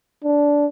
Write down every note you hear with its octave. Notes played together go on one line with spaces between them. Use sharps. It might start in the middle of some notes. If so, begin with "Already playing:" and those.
D4